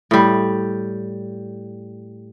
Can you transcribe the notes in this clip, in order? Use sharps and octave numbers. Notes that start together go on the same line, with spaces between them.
A2 G3